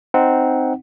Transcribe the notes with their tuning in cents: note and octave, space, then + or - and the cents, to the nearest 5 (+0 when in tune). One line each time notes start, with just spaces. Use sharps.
C4 +0 D#4 +5 F#5 +0